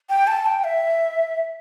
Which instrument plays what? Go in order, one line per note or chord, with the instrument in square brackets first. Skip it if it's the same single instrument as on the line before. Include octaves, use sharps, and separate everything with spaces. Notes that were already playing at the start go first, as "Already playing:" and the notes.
[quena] G5
A5
G5
E5